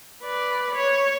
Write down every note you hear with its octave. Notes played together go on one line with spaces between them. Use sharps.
B4 D5
C#5